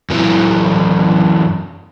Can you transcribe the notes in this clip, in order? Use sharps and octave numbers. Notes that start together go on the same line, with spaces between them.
F#2 E3